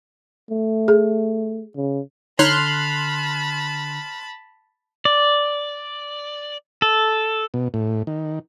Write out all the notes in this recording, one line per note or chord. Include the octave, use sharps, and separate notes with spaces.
A3
G#4
C#3
D3 D#4 C#5 A5 B5 C6 F6 F#6
D5
A4
B2
A2
D#3